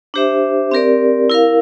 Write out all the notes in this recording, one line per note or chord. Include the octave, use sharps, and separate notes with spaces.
D4 G4 C5 E5
C4 G4 A#4 D5
E4 A#4 F5